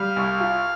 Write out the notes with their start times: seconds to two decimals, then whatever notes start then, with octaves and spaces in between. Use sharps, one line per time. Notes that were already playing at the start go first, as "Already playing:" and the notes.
Already playing: G3 F5
0.16 C2
0.40 F4